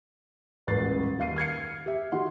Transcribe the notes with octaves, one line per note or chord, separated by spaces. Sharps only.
D#1 A1 G#3 B4 A6 C7
D#2 F5 C7 D#7
F6 G#6 C7 C#7
G4 E5
D#3 F#4 G4 F#5 C6